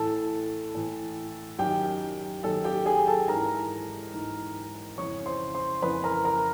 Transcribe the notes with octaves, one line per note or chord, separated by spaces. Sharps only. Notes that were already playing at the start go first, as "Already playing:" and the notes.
Already playing: A2 E3 A4 A5
A2 E3
F#2 D#3 G4 G5
F#2 D#3 A4 A5
G4 G5
G#4 G#5
A4 A5
G#2 E3 A#4 A#5
G#2 E3
F2 C#3 E3 C#5 C#6
C5 C6
C5 C6
F2 C#3 E3 B4 B5
A#4 A#5
A#4 A#5